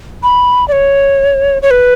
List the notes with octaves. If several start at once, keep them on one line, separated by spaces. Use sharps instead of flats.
B5
D5
C#5
C#5
B4